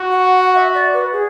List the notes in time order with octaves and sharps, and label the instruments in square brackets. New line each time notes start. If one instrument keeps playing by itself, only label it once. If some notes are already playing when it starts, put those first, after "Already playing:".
Already playing: [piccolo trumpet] F#4
[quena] F#5
F#5
E5
D5
B4
G#4